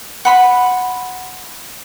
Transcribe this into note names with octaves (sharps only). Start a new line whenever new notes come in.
F#5 B5 C6